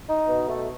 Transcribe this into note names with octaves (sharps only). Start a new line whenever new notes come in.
D#4
B2
A3